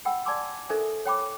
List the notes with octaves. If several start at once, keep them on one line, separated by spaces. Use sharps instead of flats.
F#5 G5 B5 E6
D5 G#5 A5 C6 D6 E6
D#4 A4 A#4 C5 E5 G#5
C#5 G5 B5 D6